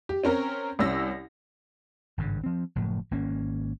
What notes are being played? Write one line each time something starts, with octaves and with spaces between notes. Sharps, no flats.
G4
C4 C#4 A#4 A#5
C2 C#4 E6 A#6
G#1 G2 C#3
F3 C4
F#1 A2 F3
G#1 A#3 C#4